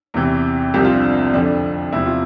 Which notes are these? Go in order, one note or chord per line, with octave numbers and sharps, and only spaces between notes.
E2 C3 E3
C2 C3 F3 G4
F4
D4
F2 D3 F3 D4
E2 C3 F3 E4
F4